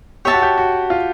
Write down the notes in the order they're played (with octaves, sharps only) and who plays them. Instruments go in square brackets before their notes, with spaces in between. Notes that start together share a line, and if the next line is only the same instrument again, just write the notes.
[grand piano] G4 [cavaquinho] C#5 E5 A5
[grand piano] F#4
G4
F#4
F4